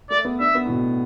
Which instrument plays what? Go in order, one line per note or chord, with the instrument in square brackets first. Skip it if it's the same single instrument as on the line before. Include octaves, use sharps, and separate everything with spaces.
[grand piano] A3 [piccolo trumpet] D5
[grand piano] B3
[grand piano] D4 [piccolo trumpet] E5
[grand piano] B3
A2
B2